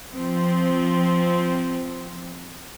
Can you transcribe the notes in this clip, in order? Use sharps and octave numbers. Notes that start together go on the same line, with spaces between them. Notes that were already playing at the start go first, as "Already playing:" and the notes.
F3 C4